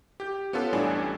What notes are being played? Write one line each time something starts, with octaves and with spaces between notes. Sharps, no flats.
G4 G6
B3 C#4 F4 A4 B4
A1 A2 G3 D4 G#5